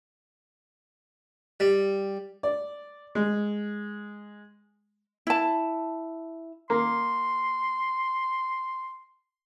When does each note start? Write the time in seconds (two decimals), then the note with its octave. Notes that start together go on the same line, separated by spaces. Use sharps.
1.60 G3
2.43 D5
3.15 G#3
5.27 E4 A5
6.70 A#3 C6